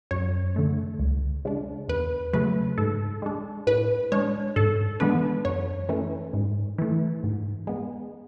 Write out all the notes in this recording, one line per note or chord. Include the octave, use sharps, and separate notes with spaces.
F#2 C#5
D3 A3
C#2
C#3 G#3 D4
E2 B4
C#3 F#3 A3 B4
G#2 A4
G#3 D4
A2 B4
G#3 D4 C#5
G#2 A4
E3 G#3 B3 D4 B4
F#2 C#5
E3 A3 C#4
G#2
E3 A3
G#2
G#3 B3